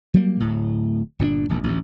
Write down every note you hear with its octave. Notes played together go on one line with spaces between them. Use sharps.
F#3 G3 A#3
D1 A2
G1 A#2 C#4 D4
E1 A#1 D#2
A1 D2